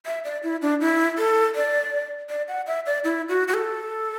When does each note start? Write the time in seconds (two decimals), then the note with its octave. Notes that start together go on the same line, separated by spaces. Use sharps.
0.06 E5
0.25 D5
0.43 E4
0.62 D4
0.81 E4
1.18 A4
1.55 D5
2.29 D5
2.48 F#5
2.67 E5
2.86 D5
3.04 E4
3.29 F#4
3.48 F#4
3.54 A4